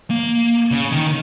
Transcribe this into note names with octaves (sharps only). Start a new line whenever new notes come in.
A#3
C#3
D#3